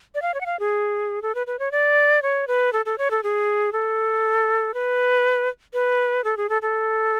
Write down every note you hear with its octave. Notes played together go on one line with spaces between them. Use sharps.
D5
F5
C#5
F#5
F5
G#4
A4
B4
B4
C#5
D5
C#5
B4
A4
A4
C#5
A4
G#4
A4
B4
B4
A4
G#4
A4
A4